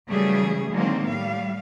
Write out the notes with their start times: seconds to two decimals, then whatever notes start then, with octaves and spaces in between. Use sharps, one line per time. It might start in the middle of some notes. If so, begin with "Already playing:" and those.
0.10 C#3 E3 F#3 G3 A3 G#4
0.72 D3 D#3 F#3 G#3 A#3 C4
1.07 A2 G3 F5